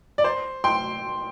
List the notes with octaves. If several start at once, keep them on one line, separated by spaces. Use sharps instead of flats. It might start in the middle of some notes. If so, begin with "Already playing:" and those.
D5
C5
G5 C6